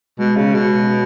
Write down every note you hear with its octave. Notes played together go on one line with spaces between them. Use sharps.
B2 G#3
C#3
B2